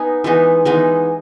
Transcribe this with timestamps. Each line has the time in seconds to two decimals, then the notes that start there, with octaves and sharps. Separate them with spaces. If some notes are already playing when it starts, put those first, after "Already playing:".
Already playing: B3 D#4 G#5
0.24 E3 G#3 B3 D#4
0.65 E3 G#3 B3 D#4